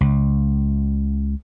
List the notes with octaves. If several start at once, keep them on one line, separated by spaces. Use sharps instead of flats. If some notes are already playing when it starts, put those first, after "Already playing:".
C#2